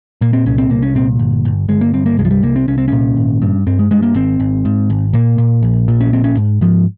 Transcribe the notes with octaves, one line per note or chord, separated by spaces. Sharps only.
A#2 A#3
C4
C2 C#4
C4
C2 A#3
C#4
A#2 C4
G1
G1
G1 G#3
A#3
G2 C4
A#3
C2 G#3
F3
G3
C2 A#3
C4
C2 C#4
C4
A#2 C#4
G#1
G2
G2 C4
G#3
G2 G#3
A#3
G#1 C4
G#1
G#2
G#1
A#2 A#3
A#2
A#1
A#2
C#4
A#1 C4
C#4
G#2
G#2 F3